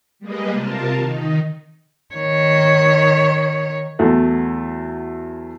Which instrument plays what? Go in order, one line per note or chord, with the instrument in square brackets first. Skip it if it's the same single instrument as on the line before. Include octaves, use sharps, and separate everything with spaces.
[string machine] G3 G#3 A#3 G#4 B4 D#5
C3 F4 A#4 A5
D#3 D#4
[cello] D#3 C#5
[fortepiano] E2 F#3 A3